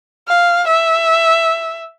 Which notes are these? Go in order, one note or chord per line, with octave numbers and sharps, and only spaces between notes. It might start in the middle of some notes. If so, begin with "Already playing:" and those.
F5
E5